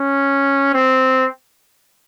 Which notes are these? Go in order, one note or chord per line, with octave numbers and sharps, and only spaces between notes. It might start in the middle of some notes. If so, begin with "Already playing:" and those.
Already playing: C#4
C4